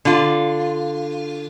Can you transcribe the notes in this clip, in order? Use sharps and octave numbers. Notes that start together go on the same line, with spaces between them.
D3 F4